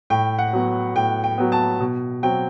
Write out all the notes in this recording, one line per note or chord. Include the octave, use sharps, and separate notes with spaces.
A2 G5
F#5
F#3 B3
A2 G5
G5
F#3 B3
A5
B2
F#3 C4 G5